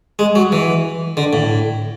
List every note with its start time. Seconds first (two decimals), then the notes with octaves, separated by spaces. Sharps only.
0.19 G#3
0.35 F#3
0.52 E3
1.17 D3
1.33 A2